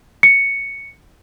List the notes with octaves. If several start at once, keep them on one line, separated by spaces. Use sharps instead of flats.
C#7